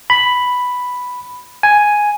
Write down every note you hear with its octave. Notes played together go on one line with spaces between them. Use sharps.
B5
G#5